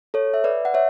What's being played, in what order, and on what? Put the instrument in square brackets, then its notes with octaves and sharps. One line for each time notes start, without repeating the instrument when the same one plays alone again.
[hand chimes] A4 C#5
E5
B4 D5
F#5
C#5 E5